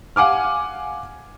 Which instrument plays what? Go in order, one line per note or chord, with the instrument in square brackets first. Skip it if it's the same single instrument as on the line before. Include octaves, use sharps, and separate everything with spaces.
[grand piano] F5 F#5 G#5 D6 F6